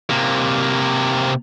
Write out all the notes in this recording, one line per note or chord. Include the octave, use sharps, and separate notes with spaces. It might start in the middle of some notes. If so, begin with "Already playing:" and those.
C3 A#3